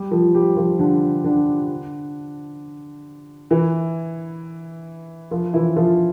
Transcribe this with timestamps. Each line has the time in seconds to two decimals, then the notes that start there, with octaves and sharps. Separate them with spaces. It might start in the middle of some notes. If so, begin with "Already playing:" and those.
Already playing: G3 G4
0.11 F3 F4
0.34 G3 G4
0.57 F3 F4
0.79 D3 D4
1.24 D3 D4
3.51 E3 E4
5.31 F3 F4
5.54 E3 E4
5.76 F3 F4